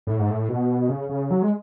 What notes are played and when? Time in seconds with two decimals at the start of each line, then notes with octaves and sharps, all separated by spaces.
0.07 A2
0.19 G#2
0.30 A2
0.49 B2
0.89 C#3
1.09 C#3
1.31 F#3
1.42 G#3